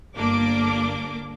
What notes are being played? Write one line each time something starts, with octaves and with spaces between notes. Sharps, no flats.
G1 G2 A#3 D4 D6